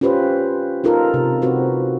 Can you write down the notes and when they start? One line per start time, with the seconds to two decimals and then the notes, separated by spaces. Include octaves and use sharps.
0.01 C#4 F4 G4 B4 C5
0.84 D#4 F4 A4 A#4
1.14 C3
1.42 C4 F#4 B4